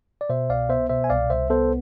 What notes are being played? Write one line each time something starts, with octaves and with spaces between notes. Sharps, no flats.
D5
B2 C5 E5
C2 D5 F5
B3 C5 E5
B2 C5 E5
G#5
C2 D5 F5
C2 C5 E5
B3 A4 C5